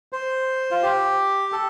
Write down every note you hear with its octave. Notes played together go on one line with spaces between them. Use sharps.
C5
F4
G4
A4